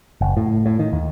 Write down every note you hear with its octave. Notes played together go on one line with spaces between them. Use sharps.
F#1
A2
A2
D#3
D#2